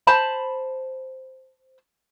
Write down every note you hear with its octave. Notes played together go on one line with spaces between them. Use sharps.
C5 A5 B5